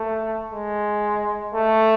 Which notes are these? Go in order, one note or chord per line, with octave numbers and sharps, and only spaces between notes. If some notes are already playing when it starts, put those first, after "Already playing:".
Already playing: A3
G#3
A3